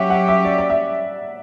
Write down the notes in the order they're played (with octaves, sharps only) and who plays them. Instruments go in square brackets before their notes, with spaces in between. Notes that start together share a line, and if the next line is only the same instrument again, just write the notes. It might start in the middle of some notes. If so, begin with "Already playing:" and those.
Already playing: [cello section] F#3 C#4 G4 [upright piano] E5 F#5
[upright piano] F#5
E5
D5
D5
E5